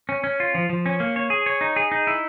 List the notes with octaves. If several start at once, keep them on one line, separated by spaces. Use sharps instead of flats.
C#4
C#4
F4
F3
F3
C#4
A#3
C#5
G#4
C#5
D#4
G#4
D#4
E4